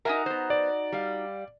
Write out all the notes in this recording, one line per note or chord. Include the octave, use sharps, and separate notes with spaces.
D#4 F#4 A#4 E5 G#5 A#5
B3 C5
D5
G3 F5